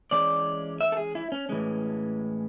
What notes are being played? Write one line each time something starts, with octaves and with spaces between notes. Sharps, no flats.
E3 G#3 C#4 D5
E5
A4
G#4
E4
C#4
A2 E3 G#3 C#4